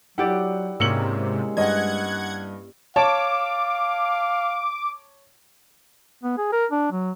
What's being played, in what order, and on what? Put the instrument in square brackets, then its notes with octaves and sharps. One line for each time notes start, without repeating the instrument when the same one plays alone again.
[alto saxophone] F#3 [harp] E4 G4 D5 [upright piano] F#5
[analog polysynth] G#2 C3 [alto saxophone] G#3 [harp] A#3 C#4 [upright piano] E6 C#7 F#7
[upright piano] G2 D#5 [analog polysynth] F#5 G#6
[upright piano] C#5 A5 [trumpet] F5 [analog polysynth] D6
[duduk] B3
G#4
A#4
D4
F#3